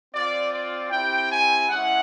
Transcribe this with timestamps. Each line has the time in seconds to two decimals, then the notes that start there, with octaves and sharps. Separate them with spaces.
0.13 C4 F4 D5
0.51 D5
0.90 C4 E4 G4 G5
1.29 G#5
1.68 G#3 C#4 E4 F#5